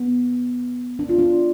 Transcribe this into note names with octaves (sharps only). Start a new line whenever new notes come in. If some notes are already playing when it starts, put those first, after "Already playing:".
Already playing: B3
D4
F4
D4